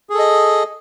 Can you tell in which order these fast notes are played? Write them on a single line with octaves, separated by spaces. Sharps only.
G#4 A4 D#5